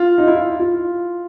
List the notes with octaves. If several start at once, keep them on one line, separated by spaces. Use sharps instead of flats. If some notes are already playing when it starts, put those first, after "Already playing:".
Already playing: F4
D#4
E4
F4
F4